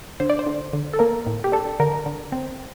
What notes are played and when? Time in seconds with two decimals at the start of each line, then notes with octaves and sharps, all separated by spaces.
0.20 D3 C5
0.30 D5
0.39 C5
0.46 D3
0.73 D3
0.93 A4
0.99 A#3 A#4
1.26 A2
1.44 G4
1.52 D4 A4
1.80 D3 A#4
2.06 D3
2.32 C4